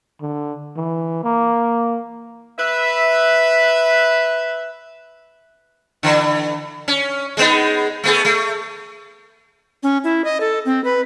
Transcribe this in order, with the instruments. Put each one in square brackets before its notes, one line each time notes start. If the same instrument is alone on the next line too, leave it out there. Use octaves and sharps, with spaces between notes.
[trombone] D3
E3
A#3
[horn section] B4 E5
[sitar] D3 E3
C#4
G#3 B3 D#4
A3 B3 G#4
A3
[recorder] C#4
E4
D#5
A4
C4
B4